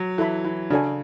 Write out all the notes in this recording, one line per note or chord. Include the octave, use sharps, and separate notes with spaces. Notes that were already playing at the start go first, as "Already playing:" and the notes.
Already playing: F#3
E3 A4 E5 B5
E3
C#3 D4 F#4 A4 C#5 G#5